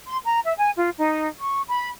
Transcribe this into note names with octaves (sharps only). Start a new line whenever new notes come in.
C6
A#5
E5
G#5
F4
D#4
C#6
B5